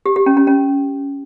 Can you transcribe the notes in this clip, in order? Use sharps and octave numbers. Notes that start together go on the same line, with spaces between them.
G4
G4
C#4
C#4
C#4